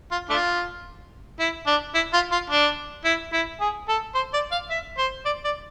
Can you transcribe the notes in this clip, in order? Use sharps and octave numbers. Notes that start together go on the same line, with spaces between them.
F4
A3 D4 F4
E4
D4
E4
F4
F4
D4
E4
E4
G#4
A4
C5
D5
F5
E5
C5
D5
D5